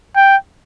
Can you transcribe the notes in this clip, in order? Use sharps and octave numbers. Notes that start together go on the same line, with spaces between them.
G5